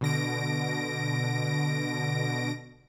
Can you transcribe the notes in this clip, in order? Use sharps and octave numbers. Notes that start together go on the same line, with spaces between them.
B2 D3 A#6 D7